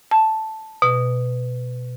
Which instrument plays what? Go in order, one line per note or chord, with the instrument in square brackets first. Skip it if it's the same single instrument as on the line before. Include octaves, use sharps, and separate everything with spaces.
[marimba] A5
B2